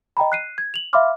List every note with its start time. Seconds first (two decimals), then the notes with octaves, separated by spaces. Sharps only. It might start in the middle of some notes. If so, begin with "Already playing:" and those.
0.17 D#5 G5 A#5 B5
0.32 F#6 C7 D#7
0.58 G#6
0.74 F7 F#7
0.93 E5 F5 B5 C6 D6 F6